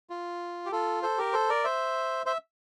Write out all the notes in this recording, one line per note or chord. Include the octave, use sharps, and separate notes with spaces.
F4
G4
F4 A4
A4 C5
G4 A#4
A4 C5
A#4 D5
C5 E5
C5 E5